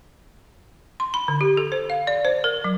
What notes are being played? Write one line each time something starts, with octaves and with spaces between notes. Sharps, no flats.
C6
B5
D3
G4
A4
C5
F5
D5
C5
A#4
F#3